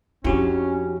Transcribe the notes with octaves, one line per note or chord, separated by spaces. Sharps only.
F2 C#4 D4 E4 F#4 G4